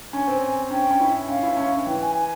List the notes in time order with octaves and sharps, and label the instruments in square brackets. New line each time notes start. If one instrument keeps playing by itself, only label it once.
[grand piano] C#4 [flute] G#5
[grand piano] C4
[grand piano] C#4 [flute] G5
[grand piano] C#4
E4
[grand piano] C#4 [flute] F5
[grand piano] E4
C#4
C#4
[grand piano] E3 [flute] G5
[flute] G#5
G#5